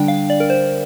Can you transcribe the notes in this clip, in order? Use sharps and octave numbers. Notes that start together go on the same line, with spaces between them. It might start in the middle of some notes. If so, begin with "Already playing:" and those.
Already playing: D3 G3 D4 G5
F5
D5
A#4
C5